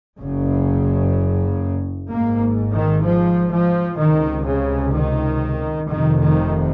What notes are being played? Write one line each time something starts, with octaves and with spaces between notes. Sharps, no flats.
F#1 F#2 C#3
G#1 G#2 A#3
D#3
F3
F3
C#2 C3 D#3
C#3
D#3
F1 F2 C3 D#3
D#3